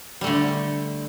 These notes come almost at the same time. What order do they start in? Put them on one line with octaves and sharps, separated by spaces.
G3 A3 D3